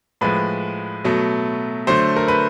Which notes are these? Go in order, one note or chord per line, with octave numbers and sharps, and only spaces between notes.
A2 F3 G#3 B4
B2 F#3 A3
D3 F#3 A3 C5
A#4
B4